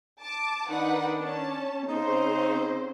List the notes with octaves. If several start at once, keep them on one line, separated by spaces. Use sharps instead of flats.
A5 D6
D#3 D4 D#4 B4 F#5
C#4 A5
C#3 C4 D#4 C5